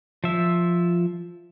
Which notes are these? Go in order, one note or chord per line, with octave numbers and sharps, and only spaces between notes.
F3 E5